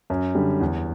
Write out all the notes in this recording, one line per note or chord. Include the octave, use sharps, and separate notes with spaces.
F#2
D3 G3
E2